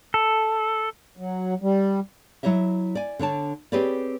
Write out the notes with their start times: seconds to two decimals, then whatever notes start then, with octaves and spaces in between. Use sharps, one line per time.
0.14 A4
1.17 F#3
1.62 G3
2.43 F#3 E4 C#5 D#5 E5
2.95 D5 G#5
3.19 D3 D4 C#5 A5
3.72 C4 G4 G#4 B4 C#5 D5